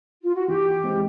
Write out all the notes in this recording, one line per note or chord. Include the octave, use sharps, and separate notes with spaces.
F4
F#4
E3 G4
G#3 C4